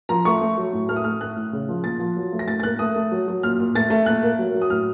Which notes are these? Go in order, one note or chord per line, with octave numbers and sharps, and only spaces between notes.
F3 A#5
A3 C#6
A3
F#3
A2
A3 F6
D#6
A3 F6
A2 F#6
A2
C#3
F3
A#2 A6
F3
F#3
A3
A#6
A2 A6
A6
A#3 F#6
A3 D#6
A3
F#3
F#3
A#2 F6
A#2
A3 A6
A3
A#2 F#6
A#3
F#3
F#3
D#6
A2 F6